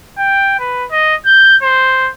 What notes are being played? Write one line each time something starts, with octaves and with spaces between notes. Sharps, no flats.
G5
B4
D#5
G6
C5